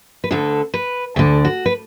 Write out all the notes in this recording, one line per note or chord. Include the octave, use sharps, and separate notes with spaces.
B4
D2 D3 A4
B4
D2 D3 A4
F#4
B4